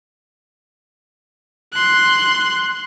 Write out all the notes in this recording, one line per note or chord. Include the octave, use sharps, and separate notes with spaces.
C6 F#6